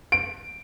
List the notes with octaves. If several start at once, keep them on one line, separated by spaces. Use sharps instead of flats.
D7